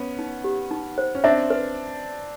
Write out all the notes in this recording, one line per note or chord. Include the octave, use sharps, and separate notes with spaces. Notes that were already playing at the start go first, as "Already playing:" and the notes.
Already playing: B3 C#4
D#4
G4
D#4
C5
C#4
C4 D4 E5
B4